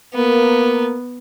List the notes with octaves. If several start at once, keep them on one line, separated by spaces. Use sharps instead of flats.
A#3 B3 A#4